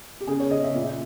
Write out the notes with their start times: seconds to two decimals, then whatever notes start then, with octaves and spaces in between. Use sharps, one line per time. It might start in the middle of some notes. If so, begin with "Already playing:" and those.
0.21 G4
0.27 C#3 G#4
0.40 C#5
0.51 C#3 D#5
0.63 E5
0.75 A#2
0.83 E5